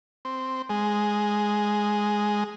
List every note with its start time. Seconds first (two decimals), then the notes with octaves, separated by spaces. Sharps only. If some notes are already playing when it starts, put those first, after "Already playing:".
0.25 C4
0.69 G#3